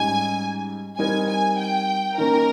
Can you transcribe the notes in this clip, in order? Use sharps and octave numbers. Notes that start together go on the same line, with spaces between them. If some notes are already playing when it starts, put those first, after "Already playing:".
Already playing: G#2 G3 C#4 G4 G#5
G3 C4 D#4 A#4 G#5
G#5
G5
D#3 A#3 C#4 A#4